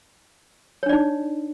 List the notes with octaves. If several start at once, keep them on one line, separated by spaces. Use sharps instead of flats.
D4 D#4 C#5 D5